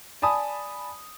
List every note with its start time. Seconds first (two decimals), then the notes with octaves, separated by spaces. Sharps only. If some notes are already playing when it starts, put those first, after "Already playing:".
0.22 D5 G#5 A5 B5 D#6